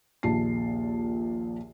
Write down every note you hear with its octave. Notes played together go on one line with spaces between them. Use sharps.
A#1 D#2 A#2 A5 C7